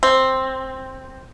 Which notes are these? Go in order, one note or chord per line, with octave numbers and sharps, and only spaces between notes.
C4